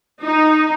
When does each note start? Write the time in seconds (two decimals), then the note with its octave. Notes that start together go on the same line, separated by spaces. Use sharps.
0.21 D#4